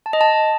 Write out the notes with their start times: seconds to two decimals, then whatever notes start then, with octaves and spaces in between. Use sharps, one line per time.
0.06 A5
0.13 D#5
0.21 A5